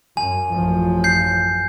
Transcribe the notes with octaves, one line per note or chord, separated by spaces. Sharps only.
F#2 G#5
A1 F#2 F3
G6 C7